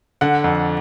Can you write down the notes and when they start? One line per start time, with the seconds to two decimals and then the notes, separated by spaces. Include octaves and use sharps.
0.21 D3 F#5
0.44 F2